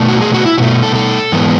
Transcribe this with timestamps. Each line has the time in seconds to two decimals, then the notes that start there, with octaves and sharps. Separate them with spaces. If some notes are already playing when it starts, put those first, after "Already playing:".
Already playing: B2 A3
0.09 F#4
0.21 G#4
0.34 F#4
0.45 E4
0.58 B2 F#4
0.62 A3
0.83 A4
0.95 A4
1.32 G#2 E3 G#3 B3